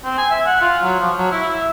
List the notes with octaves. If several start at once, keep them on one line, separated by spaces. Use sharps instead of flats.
C4
G#5
E5
F#5
F4
F#3
F3
F#3
E4
E5